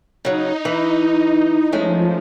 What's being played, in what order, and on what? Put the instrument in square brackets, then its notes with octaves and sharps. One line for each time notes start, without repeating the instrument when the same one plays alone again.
[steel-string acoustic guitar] C#3 F#3 [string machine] D#4
[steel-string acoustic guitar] E3
[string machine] F3 [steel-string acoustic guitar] G#3 A3 C#4